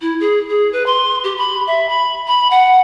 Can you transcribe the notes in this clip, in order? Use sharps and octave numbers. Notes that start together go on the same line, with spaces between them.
E4
G#4
G#4
B4
C6
G4
B5
E5
B5
B5
F#5